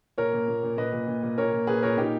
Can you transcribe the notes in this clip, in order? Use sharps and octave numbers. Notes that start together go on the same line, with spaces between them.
A#2 A#4 C#5
A#2
A#2
A#2
A#2 B4 D#5
A#2
A#2
A#2
A#2 A#4 C#5
A#2
A#2 G#4 B4
A#2 A#4 C#5
A#2 D#4 G4